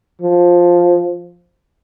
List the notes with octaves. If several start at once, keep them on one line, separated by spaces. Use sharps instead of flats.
F3